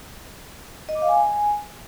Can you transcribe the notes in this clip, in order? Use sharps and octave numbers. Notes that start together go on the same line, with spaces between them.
D#5
D6
F5
G#5